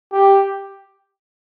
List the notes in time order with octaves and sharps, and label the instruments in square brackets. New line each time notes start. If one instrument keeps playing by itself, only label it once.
[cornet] G4